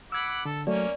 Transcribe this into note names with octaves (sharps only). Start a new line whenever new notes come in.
F#5 B5 D6 E6 G#6
D3 A4
F#3 A3 A#3 C#4 D5